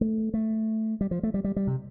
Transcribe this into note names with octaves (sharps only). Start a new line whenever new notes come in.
A3
A3
G3
F3
A3
G3
G3
G3
C3